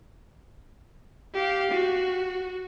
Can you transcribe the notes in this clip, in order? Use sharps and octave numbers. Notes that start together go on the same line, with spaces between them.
G4 F5
F#4